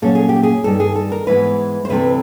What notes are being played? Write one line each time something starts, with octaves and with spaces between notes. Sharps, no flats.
A#2 F#3 A#3 C#4 A4
G#4
G4
G#4
G2 D#3 G3 A4
G#4
A4
A#4
G#2 E3 G#3 B3 B4
C5
D2 C3 E3 A3 C4 B4